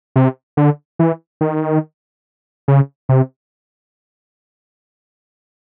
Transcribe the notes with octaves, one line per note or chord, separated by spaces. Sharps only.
C3
D3
E3
D#3
C#3
C3